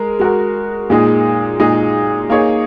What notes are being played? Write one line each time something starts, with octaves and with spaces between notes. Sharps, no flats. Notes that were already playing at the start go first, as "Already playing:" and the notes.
Already playing: G#3 A#4
G#3 F#4 A#4
A#2 G#3 D#4 G#4
A#2 G#3 D#4 G#4
A#3 D#4 G#4 C#5